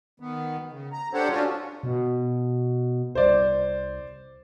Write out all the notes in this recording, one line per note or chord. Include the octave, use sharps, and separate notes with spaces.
D#3 B3
C#3
A#5
D4 G4 A4 C5 C#5 F#5
C#4 D4 F4 F#4
B2
C2 C5 D5